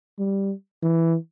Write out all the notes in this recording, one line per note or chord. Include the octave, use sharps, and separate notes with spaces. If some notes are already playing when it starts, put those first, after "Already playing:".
G3
E3